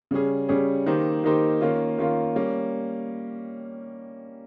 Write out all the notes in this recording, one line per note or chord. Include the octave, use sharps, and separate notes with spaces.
C#3 G3 C#4 G#4
C#3 G3 C#4 G#4
D#3 A#3 D#4 G4 C5
D#3 A#3 D#4 G4 C5
D#3 A#3 C#4 F4
D#3 A#3 C#4 F4
G3 A#3 C#4